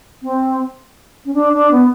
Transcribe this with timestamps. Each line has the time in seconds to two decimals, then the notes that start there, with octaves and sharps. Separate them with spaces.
0.22 C4
1.25 C#4
1.34 D4
1.52 D4
1.71 B3